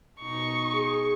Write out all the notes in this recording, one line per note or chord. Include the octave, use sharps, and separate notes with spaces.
B2 D#4 C#6
G#4